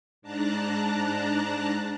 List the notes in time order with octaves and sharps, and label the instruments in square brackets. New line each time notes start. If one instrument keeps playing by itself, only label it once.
[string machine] G#2 D4 A5 A#5 F#6